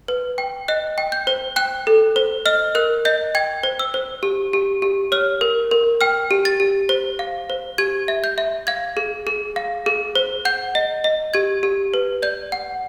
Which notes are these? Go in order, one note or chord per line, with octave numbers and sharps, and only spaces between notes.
B4
G5
D#5 F#6
G5
G6
C5
G5 F#6
A4
C5
D#5 F6
A#4 F#6
D#5 G6
G5 G#6
C5
E6
C5
G4
G4
G4
C#5 F6
A#4
A#4
G5 F6
G4
A6
G4
C5
F5
C5
G4 G#6
E5
G6
E5
F5 G#6
G#4
G#4
F5
G#4
C5
F#5 G6
D#5
D#5
G4 G#6
G4
B4
D5 G6
F#5